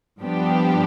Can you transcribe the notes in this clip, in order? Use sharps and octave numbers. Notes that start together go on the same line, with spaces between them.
G2 F3 B3 D4 G4